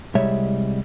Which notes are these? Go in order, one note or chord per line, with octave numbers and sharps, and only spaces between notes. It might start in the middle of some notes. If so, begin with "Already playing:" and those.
C2 G3 G#3 C#5 E5